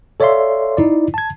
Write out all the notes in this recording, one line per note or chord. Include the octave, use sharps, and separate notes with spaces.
A4 C#5 D5 E5 F5 C6
D#4 E4 D5
A5 G#6